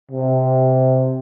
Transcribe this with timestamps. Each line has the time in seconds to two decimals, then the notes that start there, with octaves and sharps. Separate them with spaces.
0.12 C3